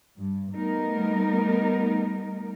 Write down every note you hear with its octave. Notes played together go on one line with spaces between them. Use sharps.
G2
G3 A3 B3 D#4 A#4